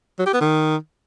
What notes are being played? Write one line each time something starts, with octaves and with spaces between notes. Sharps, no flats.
F#3
G4
B3
D#3